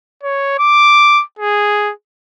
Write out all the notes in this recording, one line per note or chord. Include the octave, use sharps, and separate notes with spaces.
C#5
D6
G#4